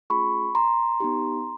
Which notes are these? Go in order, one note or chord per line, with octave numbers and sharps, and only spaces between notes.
A3 C#4 F4 G#4 B5 C#6
A#5 C6
B3 D#4 G4